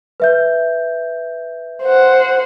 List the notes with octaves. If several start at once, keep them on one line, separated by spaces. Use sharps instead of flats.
B4 E5 G6
C5 F#5